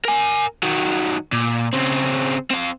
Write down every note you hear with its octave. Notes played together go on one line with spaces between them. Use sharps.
A#4 G#5
D#3 F#3
A#2
C#3 C4
C4 F5